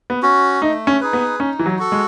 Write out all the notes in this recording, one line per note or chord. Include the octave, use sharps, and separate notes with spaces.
B3
C#4 F#4
A3 D#4
C#4
D#4 G#4 B4
B3
C#4 D#4
E3
F#3
F#4 A4
G#3